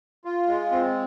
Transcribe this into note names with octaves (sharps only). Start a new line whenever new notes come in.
F4
G#3
C4